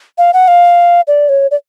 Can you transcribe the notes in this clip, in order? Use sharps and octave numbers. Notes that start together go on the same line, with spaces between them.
F5
F#5
F5
D5
C#5
D5